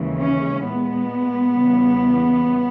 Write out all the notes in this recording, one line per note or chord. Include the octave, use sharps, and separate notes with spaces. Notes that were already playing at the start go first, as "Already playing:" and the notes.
Already playing: D#2 C#3 E3 G#3
C#4
A#2 G#3 B3
E2 C#3 E3 G3